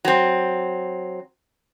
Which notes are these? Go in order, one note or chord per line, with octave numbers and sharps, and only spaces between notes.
F#3 C4